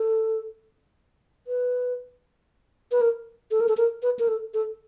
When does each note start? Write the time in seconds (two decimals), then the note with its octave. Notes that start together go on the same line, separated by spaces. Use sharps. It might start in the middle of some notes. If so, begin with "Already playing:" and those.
Already playing: A4
1.47 B4
2.92 B4
3.01 A#4
3.51 A4
3.61 A#4
3.69 A4
3.77 A#4
4.03 B4
4.19 A#4
4.28 A4
4.54 A4